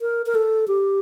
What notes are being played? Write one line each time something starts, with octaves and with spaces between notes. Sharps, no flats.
A#4
A#4
A4
G4